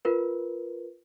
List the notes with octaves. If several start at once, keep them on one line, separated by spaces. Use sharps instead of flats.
F4 A#4 B4